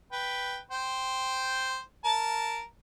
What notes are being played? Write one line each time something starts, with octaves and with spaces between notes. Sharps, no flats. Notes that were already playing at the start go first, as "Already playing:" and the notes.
B4 G5
C5 G5
A#4 A5